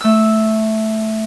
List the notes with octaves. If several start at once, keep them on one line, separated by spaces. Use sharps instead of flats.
A3 E6